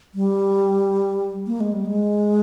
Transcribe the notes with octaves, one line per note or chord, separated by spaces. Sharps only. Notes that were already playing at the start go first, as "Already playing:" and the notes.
G3
A#3
G#3
G3
G#3